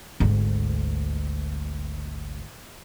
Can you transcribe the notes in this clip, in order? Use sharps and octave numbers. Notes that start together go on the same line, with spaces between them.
G#1 D2